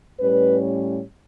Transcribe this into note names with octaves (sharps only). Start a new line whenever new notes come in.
A2 G3 C#4 B4